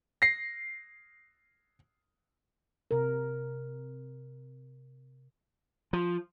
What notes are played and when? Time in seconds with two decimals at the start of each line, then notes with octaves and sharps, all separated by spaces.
0.22 A#6 C7
2.91 C3 A#4
5.93 F3